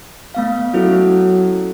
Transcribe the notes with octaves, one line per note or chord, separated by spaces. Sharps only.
A3 B3 F5
F#3 C#4 E4 A4